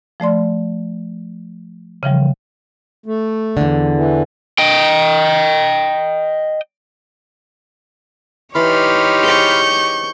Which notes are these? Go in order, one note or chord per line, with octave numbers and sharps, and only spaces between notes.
F3 A3 D5 C6
C#3 E3 F3 G3
A3
E2 D3
E3
D#5 G5
E3 D#4 G4 C#5 D5 B5 C6 F6
G#4 C5 D5 C#6 G6